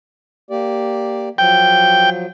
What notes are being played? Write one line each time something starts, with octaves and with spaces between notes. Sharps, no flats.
A#3 G4 D5
F3 F#3 G5